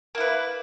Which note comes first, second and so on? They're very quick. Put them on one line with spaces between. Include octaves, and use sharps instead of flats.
A#3 E4 B4